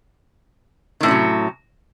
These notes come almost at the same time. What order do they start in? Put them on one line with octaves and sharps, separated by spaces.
D#3 A2 C#4 C3 F#3